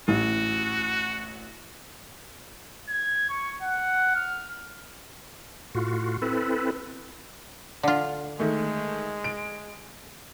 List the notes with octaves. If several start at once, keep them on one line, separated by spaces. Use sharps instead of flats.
A1 F#4
G#6
C#6
F#5
F6
A2 F4 F#4
C4 E4 A4 B4
D3 F4
D#3 G#3 A3
D7